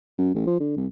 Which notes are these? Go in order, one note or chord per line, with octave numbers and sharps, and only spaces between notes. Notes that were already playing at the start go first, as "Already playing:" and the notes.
F#2
A1
F3
D3
C2